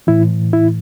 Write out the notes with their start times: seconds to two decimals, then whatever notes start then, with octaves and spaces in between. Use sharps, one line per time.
0.07 A2 E3 E4
0.53 E4